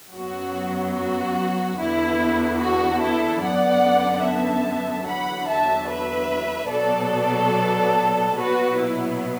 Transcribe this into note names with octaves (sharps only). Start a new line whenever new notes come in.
F#2 F#3 B3 F#4
F#4
E2 D3 B3 E4
F#4
E4 A4
F#2 D3 B3 D5 F#5
E5 A5
E2 D3 F#3 F#5 B5
E5 A5
B4 E5
B2 F#3 B3 A4 D5
B2 F#3 B3 F#4 B4
E4